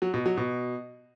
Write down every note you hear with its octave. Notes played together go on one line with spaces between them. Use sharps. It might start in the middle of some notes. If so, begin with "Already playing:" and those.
F#3
B2
F#3
B2